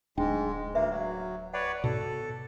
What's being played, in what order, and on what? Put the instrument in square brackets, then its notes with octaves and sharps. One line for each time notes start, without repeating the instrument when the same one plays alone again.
[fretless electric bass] D1 D4 [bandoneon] G#2 G#3 [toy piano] G5
[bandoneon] D2 A#3 [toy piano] B4 E5 F5
[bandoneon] F#3
[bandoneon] B4 C#5 D5 [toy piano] F#5
[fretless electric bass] G#2 B2 [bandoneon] A4